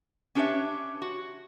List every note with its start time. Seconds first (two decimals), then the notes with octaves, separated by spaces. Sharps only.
0.35 C#4 D4 G4 B4 C#5 E5
1.02 F#4